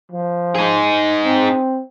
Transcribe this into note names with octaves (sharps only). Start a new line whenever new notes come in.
F3
D#4 G#4
C4